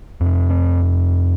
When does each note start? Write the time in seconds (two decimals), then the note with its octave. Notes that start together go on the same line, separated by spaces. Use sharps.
0.21 F2 C3
0.50 C4